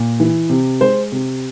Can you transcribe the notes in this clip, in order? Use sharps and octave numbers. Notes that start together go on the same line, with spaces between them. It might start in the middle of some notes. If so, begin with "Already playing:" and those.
Already playing: A#2
E3
C3
G#3 C5
C3